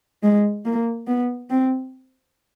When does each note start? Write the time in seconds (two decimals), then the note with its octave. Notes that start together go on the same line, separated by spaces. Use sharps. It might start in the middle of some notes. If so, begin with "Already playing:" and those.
0.23 G#3
0.65 A#3
1.07 B3
1.50 C4